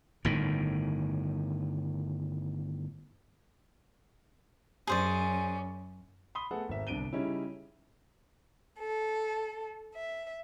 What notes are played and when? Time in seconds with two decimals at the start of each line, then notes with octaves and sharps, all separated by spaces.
0.25 G1 A2 D#3
4.87 F#2 C#4 G#4 C5 D5
6.35 B5 C6 D#6 G7
6.51 A3 B3 G#4 A4 F#5
6.69 G#1 E5
6.87 G1 C2 D4 D7 D#7 G7
7.13 C#3 G3 C#4 D#4 E4
8.78 A4
9.95 E5